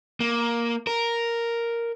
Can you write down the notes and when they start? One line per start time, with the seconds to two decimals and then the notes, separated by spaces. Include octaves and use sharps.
0.20 A#3
0.87 A#4